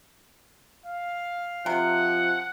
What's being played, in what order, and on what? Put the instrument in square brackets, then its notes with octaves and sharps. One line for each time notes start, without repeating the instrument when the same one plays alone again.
[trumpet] F5
[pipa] C3 [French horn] F3 [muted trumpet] F#5